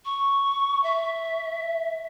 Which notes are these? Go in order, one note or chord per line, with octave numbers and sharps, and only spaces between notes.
C#6
E5